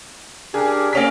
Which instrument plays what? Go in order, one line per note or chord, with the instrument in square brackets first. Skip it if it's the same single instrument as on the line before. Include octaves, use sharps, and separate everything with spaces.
[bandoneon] D4 G4 A#4 [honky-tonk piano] G#4
[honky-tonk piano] A#3 C#4 B6